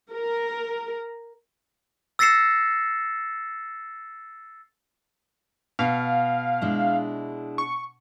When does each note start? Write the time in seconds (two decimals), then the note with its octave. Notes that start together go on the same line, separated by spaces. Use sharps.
0.10 A#4
2.19 E6 A6 A#6 C7 C#7 E7
5.79 B2 F5
6.61 G#3 D4 E4
7.58 C#6